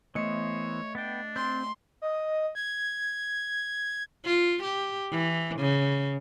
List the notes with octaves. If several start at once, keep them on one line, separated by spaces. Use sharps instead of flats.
E3 A3 B3 C5 C#5 D#5 C#7
B3 D4 G5
C4 C6 G6
D#5
G#6
F4
G4
E3
C#3